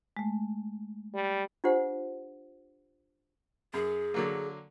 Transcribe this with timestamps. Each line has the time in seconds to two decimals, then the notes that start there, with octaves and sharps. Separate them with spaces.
0.17 G#3 A3
1.14 G3
1.64 D4 F4 G4 C5 F#5
3.74 F#2 G#4
4.14 D3 F#3 A#3